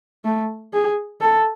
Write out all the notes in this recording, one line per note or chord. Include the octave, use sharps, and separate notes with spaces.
A3
G#4
A4